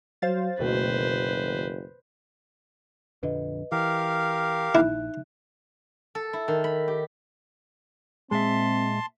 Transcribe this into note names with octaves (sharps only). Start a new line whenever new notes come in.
F#3 C5 F5 A6
F#1 D2 B2 D#3 B4 C5
A#1 F2 D3 B4 D#5
E3 G4 A#4 F5
A#1 D#4 E4 E5 F#6
A4
E4
D#3
B5
G4
A#2 G#3 C4 E5 A5 C6